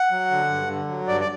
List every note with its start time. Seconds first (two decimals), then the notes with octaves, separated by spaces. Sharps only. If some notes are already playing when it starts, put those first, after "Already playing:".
Already playing: F#5
0.11 F#3
0.31 D3
0.50 G2
0.69 D3
0.88 F#3
1.08 G2 D5
1.21 D5